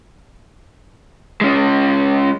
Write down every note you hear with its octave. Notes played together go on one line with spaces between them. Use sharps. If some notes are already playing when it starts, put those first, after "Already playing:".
G#3 C#4